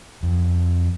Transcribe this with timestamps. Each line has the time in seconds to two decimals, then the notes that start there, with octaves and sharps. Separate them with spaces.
0.23 F2